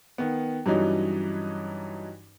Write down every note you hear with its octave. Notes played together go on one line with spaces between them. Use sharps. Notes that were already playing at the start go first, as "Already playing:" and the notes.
D#3 B3
G2 E3 F#3 G3 C#4 D#4